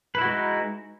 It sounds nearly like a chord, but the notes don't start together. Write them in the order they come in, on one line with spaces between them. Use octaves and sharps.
B4 E4 F#4 G#3 D#4